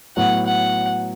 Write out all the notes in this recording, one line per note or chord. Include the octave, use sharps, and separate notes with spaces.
A2 F#3 B3 F#4 F#5
F#5